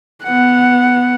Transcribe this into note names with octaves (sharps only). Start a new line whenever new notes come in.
B3 F#5